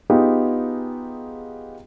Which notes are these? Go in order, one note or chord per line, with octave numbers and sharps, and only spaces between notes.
B3 D#4 F4 G4 G#4